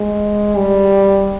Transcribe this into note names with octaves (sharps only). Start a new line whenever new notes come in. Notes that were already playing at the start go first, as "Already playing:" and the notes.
Already playing: G#3
G3